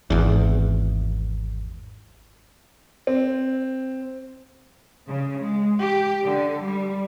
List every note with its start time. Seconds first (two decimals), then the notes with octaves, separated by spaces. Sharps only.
0.10 G#1 E2
3.07 C4
5.09 C#3
5.41 G#3
5.79 G4
6.24 D3
6.62 G3